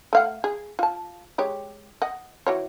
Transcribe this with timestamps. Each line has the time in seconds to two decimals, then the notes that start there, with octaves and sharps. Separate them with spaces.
0.13 A3 F5 F#5
0.44 G#4
0.79 F4 A5
1.38 G#3 G4 C#5
2.02 D#5 F#5
2.47 E3 F#4 C#5